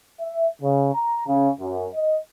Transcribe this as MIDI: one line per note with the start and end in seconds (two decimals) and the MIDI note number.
0.20 0.47 76
0.62 0.92 49
0.94 1.25 82
1.27 1.49 49
1.60 1.88 42
1.94 2.19 75